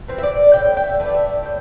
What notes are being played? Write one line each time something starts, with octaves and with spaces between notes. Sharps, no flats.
E3 C4
E5
D5
A2 G5
G5
E5
E3 A3
D5
E5
A2 G5